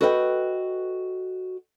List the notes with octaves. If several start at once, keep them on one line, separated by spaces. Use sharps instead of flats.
F#4 A4 B4 D#5 F5 G5